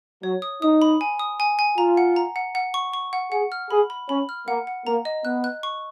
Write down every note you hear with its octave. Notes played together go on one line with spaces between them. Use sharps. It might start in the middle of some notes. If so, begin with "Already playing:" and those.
F#3 C#5
D#6
D#4 D#6
B5
G#5
D#6
G#5
G#5
F4 A#5
F#5
A#5
F#5
F#5
C#6
C#6
F#5
G#4 F#5
F6
G#4 B5
B5
C#4 B5
F6
A#3 F#5
F#5
A#3 A#5
D#5
B3 F#6
F#6
C#6